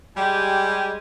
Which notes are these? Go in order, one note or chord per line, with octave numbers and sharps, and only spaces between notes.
G3 G#3 G4 G#5